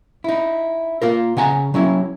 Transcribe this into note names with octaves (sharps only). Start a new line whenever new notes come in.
D#4 E4
A#3 F4 A#4
C#3 F#5 G#5 A#5
F#3 C#4 E4